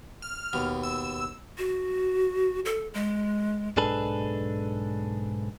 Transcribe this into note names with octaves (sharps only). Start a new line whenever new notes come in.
F6
D#2 B2
E6
F#4
A4
G#3
B1 G#2 D4 G#4 A4 B4